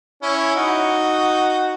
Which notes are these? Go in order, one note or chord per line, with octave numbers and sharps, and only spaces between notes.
C#4 E4
D#4 F#4